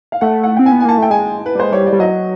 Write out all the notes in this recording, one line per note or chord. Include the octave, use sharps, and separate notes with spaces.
F5
A3 F#5
F#5
C4 G5
G#5
B3
G#5
A#3 A5
A3 G5
G#3 G#5
B4
G3
G#3 C5
G3 C#5
D5
G3
F#3 D#5